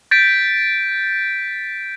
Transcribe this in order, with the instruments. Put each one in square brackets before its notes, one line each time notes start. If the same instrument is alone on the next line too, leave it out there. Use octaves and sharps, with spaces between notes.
[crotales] G6 A6 B6 D7